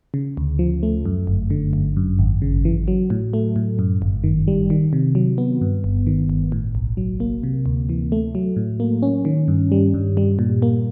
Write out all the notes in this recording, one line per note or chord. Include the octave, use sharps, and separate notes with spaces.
C#3
D2
F3
A3
F#2
G1
D3
G1
F#2
G#1
C#3
E3
F#3
A2
A3
A2
F#2
G1
D#3
G3
D#3
C3
F#3
B3
G2
G1
D#3
G1
A2
B1
F#3
A#3
C3
D2
E3
A3
F#3
A2
A#3
C#4
D#3
G2
G3
G2
G3
A#2
A#3